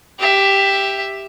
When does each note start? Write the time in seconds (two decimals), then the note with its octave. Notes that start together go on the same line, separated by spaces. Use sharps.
0.19 G4 E5